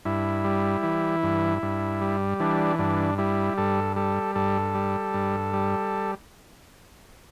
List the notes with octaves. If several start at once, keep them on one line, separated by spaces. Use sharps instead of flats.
G2 E4
G3
E3
G2
G2
G3
E3 D4
G2 D4
G3 E4
G2 A4
G3 A4
G2 A4
G3
G2
G3